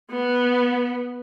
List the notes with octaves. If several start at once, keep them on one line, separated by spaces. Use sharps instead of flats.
B3